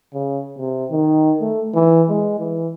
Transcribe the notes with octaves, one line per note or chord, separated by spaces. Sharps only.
C#3
C3
D#3
A3
E3
G#3
E3